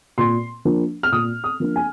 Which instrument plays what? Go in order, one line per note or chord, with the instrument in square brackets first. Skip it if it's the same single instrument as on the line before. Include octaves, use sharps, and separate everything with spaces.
[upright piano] A#2 C6
F3 A#3 D4
F6
A#2 D#6
D#6
F3 A#3 D4
G#5